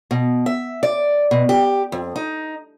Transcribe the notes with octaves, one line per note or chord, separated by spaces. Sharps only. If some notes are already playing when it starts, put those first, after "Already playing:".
B2
E5
D5
B2
G4
F2
D#4